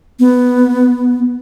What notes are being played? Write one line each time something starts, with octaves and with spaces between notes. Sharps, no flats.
B3